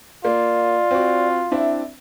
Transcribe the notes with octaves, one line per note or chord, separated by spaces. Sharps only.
A#3 F4 D5
C4 F#4
C4 D4 E4 E5